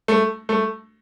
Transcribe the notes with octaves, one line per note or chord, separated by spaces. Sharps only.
A3
A3